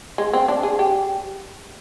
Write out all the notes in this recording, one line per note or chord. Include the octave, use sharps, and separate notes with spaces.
G#3
C4
D4
G#4
G4